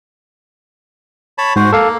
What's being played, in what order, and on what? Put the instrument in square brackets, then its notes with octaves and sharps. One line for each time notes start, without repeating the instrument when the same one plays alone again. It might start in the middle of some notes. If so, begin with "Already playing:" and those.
[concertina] C#5 A5 B5
[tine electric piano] G#2 [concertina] F#4 C5
[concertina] A#3 [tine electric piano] A4 F5